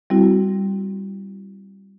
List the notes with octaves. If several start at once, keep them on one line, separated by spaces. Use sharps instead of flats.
G3 C4 E4 F#4